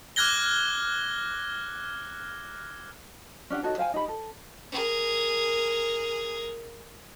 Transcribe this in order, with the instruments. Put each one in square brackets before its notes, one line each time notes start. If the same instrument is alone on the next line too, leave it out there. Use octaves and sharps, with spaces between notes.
[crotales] D6 F6 F#6 G#6 A#6 G7
[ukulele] C#4 D4 G4 F#5
D#4 F#4 A4 C#5
C5 F5 G5 G#5
D#4 G4 B5
A4
[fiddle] G#4 A#4